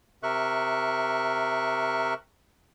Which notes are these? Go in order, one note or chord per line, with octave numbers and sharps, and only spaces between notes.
C3 A#4 E5 C#6 F#6